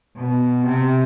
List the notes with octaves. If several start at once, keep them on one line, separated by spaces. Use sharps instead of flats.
B2
C3